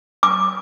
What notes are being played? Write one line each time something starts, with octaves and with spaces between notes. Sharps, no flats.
D6